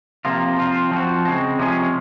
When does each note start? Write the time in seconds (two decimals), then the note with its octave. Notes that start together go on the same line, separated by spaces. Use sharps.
0.25 C3 F3 A#3 F4
0.57 F3 C4 F4
0.91 F3 C4 F#4
1.25 C#3 G#3 C4
1.59 C3 F3 G#3 C#4 G#4